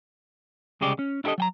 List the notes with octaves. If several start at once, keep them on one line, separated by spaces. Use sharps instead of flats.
C2 C#3 G#3 G4 D5
C#4
D4 E4 G4 A4 D#5
F#3 G5 A#5